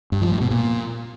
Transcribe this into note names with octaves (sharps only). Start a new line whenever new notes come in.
G2
F3
A2
B2
A#2